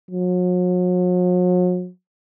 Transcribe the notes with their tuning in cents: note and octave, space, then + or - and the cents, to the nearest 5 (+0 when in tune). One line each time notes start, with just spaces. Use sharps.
F#3 -45